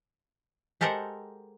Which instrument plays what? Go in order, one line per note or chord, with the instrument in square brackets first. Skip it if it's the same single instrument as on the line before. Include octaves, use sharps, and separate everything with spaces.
[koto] G#3 G4 A4 A#4 C5 F#5